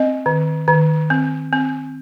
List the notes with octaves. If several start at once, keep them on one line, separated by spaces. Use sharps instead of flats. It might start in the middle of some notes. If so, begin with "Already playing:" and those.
Already playing: C4 D#5
D#3
D#3
C4
C4